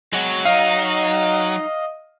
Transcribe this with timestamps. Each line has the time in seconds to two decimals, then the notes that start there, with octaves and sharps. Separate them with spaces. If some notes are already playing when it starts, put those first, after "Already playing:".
0.13 F#3 G#3 F#4
0.45 D#4 D#5 F5